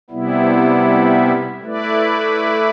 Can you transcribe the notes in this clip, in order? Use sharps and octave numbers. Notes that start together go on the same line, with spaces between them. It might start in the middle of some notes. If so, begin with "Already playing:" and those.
C3 G3 B3 E4
A3 E4 B4 D5